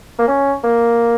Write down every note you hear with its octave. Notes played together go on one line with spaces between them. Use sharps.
A#3
C#4
A#3